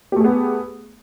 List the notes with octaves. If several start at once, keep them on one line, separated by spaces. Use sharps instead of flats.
A3 B3 G4 G#4